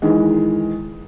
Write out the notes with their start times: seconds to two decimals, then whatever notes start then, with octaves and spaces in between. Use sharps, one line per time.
0.02 D#3 E3 G#3